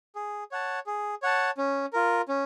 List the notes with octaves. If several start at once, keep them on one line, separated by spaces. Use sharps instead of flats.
G#4
C#5 F#5 A5
G#4
C#5 F#5 A5
C#4
F4 A#4
C#4